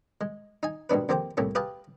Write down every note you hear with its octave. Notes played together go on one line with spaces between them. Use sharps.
G#3
D#4 G#5
D#2 G#2 B2 D4 B4
F2 A#3 C4 G4 C5 G5
C2 A2 A3 A#3 C#4
G4 G#4 B4 F5 G5 A5